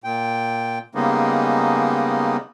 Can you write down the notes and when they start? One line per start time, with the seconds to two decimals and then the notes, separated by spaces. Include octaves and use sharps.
0.04 A#2 G5
0.95 C#3 G3 G#3 A#3 B3 D#4